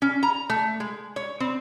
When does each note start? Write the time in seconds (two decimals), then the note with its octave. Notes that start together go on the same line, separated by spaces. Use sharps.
0.02 C#4
0.23 A#5
0.50 A3
0.80 G#3
1.16 C#5
1.40 C4